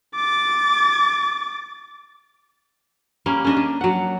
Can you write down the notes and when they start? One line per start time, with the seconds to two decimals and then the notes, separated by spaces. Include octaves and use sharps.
0.15 D6 A6
3.26 G3 A#3 C#4
3.45 C#4 D4 D#5
3.57 D4
3.81 F#3 F#5